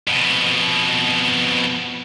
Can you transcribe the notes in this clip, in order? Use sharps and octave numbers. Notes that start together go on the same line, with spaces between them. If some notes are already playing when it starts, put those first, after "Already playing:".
F2 B2